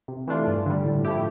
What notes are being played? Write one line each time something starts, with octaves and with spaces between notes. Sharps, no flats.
C3
E3 A3 D4 F4
G2
D3 G3
A2
F3 A3 E4 G4